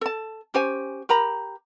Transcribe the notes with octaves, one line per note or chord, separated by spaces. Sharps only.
A4 A5
C#4 G4 C5 G#5
G4 A#4 A#5 B5